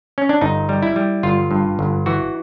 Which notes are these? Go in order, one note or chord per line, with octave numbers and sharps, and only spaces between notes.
C#4
D4
G1 D#4
G3
E4
G3
G1 F4
G2
G1
E3 F#4